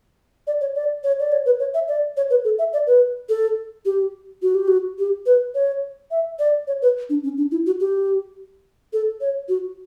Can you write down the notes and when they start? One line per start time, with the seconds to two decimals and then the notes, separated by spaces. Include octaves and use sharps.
0.47 D5
0.61 C#5
0.75 D5
1.04 C#5
1.20 D5
1.32 C#5
1.46 B4
1.60 C#5
1.74 E5
1.88 D5
2.17 C#5
2.30 B4
2.45 A4
2.59 E5
2.73 D5
2.87 B4
3.29 A4
3.85 G4
4.42 F#4
4.55 G4
4.68 F#4
4.99 G4
5.26 B4
5.55 C#5
6.11 E5
6.39 D5
6.67 C#5
6.82 B4
7.10 D4
7.24 C#4
7.38 D4
7.51 E4
7.66 F#4
7.80 G4
8.93 A4
9.21 C#5
9.49 F#4